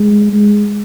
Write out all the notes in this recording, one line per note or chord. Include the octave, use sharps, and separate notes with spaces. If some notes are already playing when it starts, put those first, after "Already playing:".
Already playing: G#3
G#3